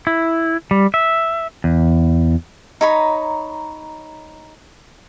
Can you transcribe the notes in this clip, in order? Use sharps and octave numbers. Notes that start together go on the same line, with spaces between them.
E4
G3
E5
E2
D#4 C#5 A#5 B5